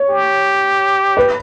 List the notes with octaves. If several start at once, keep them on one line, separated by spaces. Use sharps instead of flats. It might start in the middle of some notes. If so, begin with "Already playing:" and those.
Already playing: C#5
G4
B4